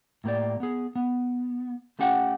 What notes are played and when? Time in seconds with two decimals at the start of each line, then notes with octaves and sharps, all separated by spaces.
0.24 A2 A#3 G4 D5
0.60 B3 G#4
0.96 B3
1.99 A3 C#4 G4 F#5 G5